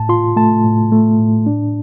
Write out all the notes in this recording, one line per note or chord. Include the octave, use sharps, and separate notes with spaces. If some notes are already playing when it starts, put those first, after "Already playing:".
Already playing: A2 A5
F4 C6
A3 A5
A2
A3
A2
D4